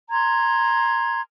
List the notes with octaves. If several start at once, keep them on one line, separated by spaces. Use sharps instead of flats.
A#5 C6 G#6